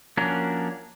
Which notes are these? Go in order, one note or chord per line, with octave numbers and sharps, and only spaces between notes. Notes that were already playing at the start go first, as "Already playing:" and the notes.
F3 A#3 C#4 D4 F#4 A#4